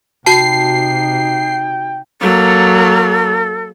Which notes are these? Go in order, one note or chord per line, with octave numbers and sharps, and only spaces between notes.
C3 D#4 F#4 G5 A5 C7
F#3 A#3 A4